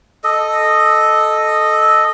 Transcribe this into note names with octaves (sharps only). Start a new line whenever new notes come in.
A4 D#5